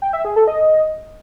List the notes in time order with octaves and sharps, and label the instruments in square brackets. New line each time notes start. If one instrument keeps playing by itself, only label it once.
[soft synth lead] G5
E5
G#4
A4
D#5